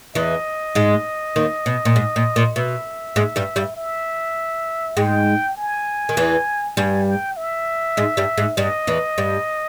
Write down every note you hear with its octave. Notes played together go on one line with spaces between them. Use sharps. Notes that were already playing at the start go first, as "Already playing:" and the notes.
E2 E3 D#5
G#2 G#3
D#2 D#3
B2
A#2
G#2
A#2
A#2
B2 E5
G#2 G#3
G2 G3
G2 G3
E5
G#2 G#3 G5
G#5
D#3
E2 E3
G2 G3 G#5
G5
E5
G#2 G#3
G2 G3
G#2 G#3
G2 G3 D#5
E2 E3
G2 G3